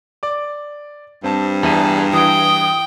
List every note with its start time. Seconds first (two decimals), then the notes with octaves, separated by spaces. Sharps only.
0.23 D5 D6
1.24 G2 C4 A5
1.63 E2 G#4 E5 A5 D#7
2.13 E3 G5 D#6